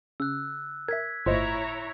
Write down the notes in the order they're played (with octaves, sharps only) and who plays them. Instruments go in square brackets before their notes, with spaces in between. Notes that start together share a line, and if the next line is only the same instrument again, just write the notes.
[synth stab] C#3 [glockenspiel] E6 F#6
[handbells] A#4 E5 [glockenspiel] G#6 B6
[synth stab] G1 A2 [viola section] E4 C#5 A#5 [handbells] F4 C5 D#5